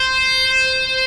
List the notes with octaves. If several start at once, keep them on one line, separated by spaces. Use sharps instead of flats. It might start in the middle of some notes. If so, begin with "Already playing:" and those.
Already playing: C5